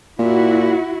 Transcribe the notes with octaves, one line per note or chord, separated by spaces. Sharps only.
A#2 E4 F#4